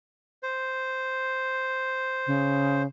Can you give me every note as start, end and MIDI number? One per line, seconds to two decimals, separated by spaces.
0.43 2.82 72
2.27 2.85 49